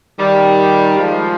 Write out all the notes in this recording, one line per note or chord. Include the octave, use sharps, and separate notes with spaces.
D#3 G3
F3 G#3